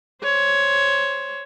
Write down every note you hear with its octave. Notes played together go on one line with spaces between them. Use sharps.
C5 C#5